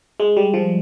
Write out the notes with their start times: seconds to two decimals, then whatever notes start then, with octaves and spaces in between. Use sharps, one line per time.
0.20 G#3
0.37 G3
0.54 F3